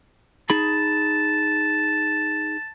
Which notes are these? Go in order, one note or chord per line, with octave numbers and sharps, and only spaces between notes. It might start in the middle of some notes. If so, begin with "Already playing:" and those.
D#4 G#4 A5 B5